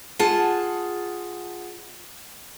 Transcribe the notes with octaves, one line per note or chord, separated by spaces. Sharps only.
F4 G#4 F#5 A5